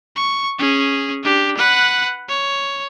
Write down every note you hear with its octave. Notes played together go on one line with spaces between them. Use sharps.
C#6
C#4 G#4
D4 G4
B4 F#5
C#5